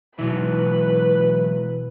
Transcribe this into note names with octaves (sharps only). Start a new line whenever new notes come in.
B2 E3 F#3 G#3 E4 B4